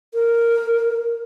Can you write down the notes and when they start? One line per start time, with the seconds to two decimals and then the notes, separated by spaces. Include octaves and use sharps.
0.14 A#4